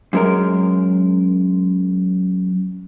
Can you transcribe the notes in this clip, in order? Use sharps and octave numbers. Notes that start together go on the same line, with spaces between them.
F#2 G#3 A#4